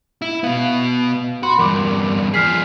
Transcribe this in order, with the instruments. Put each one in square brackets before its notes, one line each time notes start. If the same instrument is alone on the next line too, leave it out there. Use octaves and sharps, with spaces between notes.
[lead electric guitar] E4
[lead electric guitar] B2 B3 [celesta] F5
[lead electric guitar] F#4 [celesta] B5 C6
[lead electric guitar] E2 G2 [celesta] A#4 D6
[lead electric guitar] F3 G#4 [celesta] F6 B6 C7